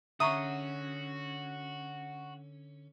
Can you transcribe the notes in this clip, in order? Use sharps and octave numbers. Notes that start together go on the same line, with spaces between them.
D3 C#4 F#4 E5 A#5 C#6 D#6